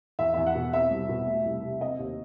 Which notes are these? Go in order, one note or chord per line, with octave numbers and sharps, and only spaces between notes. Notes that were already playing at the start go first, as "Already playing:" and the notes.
E2 E5
E2 E5
F#5
B2
C4 E5
C2
B2
A3
C2
C3
C4 D#5
D#2